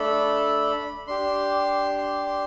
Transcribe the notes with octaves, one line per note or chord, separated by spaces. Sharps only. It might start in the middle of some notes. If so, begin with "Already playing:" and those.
Already playing: A3 D4 A4 B5
D4 G4 C6
C6
C6